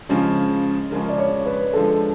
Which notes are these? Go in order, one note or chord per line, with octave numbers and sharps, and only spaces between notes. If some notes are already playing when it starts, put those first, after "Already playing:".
C#3 F3 G#3 C#4 G#4
C#3 F3 G#3 C#4 A#4
D5
C#5
B4
D3 F3 G#3 A4